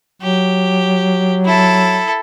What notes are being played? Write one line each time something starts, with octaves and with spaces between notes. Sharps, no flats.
F#3 G4
E4 A4